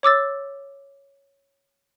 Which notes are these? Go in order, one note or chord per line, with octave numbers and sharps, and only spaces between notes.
C#5 D6 E6 A6